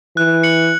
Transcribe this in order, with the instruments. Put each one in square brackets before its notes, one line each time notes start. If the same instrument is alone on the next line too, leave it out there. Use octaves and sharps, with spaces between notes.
[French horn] E3 [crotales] F#6
[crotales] C#7 F#7